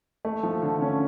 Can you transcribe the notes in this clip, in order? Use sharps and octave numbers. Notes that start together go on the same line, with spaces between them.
A3
F3
D3
C#4